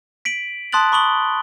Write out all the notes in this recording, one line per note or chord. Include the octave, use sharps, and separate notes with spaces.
B6 D7 F#7
A5 C6 D#6 F#6 A6 F#7
B5 C#6 D#6 F#7 G7